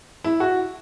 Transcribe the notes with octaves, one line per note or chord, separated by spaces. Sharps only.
E4
F#4